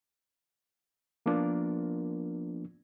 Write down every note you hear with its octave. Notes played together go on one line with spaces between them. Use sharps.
F3 A#3 B3 D4 F4 A#4